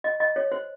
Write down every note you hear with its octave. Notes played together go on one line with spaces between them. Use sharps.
D#5
D#5
C#5
C5